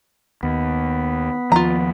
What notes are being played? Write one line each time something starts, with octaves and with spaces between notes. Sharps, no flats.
D#2 B3
D#2 F3 F4 A#5